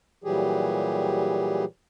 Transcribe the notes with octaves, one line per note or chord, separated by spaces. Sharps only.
A#2 E3 F#3 G3 G4 G#4